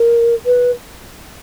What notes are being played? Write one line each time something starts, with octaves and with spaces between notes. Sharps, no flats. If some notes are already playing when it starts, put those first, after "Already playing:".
Already playing: A#4
B4